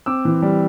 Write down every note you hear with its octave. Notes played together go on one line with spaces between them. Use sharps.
C4 D6 E6
E3
G3